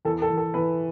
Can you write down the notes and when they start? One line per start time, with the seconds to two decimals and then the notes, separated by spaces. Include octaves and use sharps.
0.05 E2 A4
0.22 A4
0.30 E2
0.37 A4
0.54 E3 B4